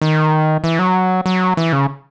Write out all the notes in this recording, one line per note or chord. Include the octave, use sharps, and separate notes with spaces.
D#3
E3
F#3
F#3
E3
C#3